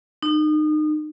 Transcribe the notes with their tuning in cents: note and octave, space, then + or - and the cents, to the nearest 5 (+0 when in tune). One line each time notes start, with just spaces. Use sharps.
D#4 -30